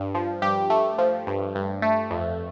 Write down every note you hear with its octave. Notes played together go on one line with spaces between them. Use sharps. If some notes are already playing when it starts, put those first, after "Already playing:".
Already playing: G2
F3
G2 G4
A3
F3
G2
G2
A3
F2